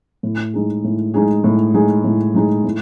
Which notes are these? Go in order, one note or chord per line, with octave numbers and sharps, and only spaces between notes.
A2
G#3 D#4 G#4
A2
G#3 D#4 G#4
A2
G#3 D#4 G#4
A2
G#3 D#4 G#4
A2